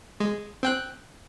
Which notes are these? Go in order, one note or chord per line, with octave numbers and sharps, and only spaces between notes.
G#3
C4 G5 F#6